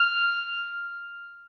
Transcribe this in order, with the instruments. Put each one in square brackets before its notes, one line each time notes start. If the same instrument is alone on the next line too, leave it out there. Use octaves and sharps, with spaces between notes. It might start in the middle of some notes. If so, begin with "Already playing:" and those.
Already playing: [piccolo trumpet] F6